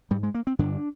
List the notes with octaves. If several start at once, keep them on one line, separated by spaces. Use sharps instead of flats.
G#2 G3
G#3
A#3
C4
G2 D3 D4